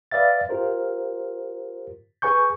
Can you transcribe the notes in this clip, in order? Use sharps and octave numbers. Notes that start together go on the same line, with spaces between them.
B4 D5 E5 F5 A6
F4 G4 A#4 C5
G#4 B4 G#5 C#6 G6